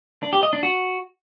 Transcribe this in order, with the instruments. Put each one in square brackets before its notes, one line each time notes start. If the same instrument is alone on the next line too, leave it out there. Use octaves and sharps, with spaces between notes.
[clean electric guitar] D4
G4
D#5
D4
F#4